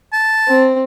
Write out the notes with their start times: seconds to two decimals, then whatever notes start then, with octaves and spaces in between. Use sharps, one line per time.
0.13 A5
0.48 C4